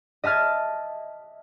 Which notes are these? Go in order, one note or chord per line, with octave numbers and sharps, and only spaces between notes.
D#5 E5 A5 F6 G#6